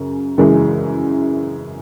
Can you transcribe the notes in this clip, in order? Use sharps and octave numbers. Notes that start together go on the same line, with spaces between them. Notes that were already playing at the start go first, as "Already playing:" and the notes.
Already playing: F#2 C#3
F#2 C#3 E3 G#3